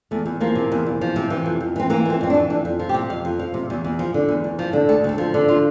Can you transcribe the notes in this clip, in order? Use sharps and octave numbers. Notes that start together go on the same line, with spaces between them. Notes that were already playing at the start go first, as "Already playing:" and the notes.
E2 A3
E2
F3 A#3
C3
E2
E2
F3
C3
E3
F2
F2
E3 C4
E3 A#3
F2 C4
F2 C4
D4
E3
F2 D4
F2
F3
G4
C3
F2 F5
F2
F3 F5
C3
E2
E2
F3
D3
E2
E2
F3
D3
D2 A4
D2 A4
F3
D3
F4